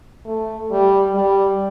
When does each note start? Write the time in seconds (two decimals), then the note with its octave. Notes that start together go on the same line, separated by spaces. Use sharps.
0.26 A3
0.71 G3
1.15 G3